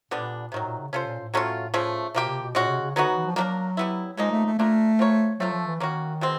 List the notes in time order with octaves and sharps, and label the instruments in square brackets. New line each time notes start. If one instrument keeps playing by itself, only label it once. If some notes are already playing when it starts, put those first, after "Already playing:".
[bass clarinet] A#2 [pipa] D3 G3 B3 D4
[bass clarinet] A2 [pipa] C3 D#3 F#3
[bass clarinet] A#2
C#3
[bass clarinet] C3 [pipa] C#4 F4 A4 C5
[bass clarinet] A#2
A2
[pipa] F#3 A3 C#4 F4
C#3 F3 A3
[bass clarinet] B2 [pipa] F3 A#3 D#4 G4
[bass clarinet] C3
B2
[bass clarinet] A#2 [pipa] G#3 C#4 F#4
[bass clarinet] C3
C#3
[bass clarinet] D3 [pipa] F#3 B3 D#4 F#4
[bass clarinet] E3
F3
[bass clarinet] F#3 [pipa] A#3 D4 G4 A#4
[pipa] G3 B3 E4
[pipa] C#3 F3 A#3 D#4 [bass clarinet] G#3
[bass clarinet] A3
A3
[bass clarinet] A3 [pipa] A#3 D4 F4 A#4
[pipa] C4 F4 A#4 C#5
[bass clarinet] F#3 [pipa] A3 C4 F4 A4
[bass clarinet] F3
E3
[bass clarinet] D#3 [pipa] A#3 C#4 F#4
[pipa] B2 G#3 C4